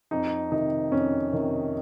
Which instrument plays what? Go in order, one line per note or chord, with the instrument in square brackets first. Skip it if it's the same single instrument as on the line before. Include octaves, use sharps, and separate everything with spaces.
[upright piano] F2 D#4
C3 D#3 D#4
F2 C#4
C3 D#3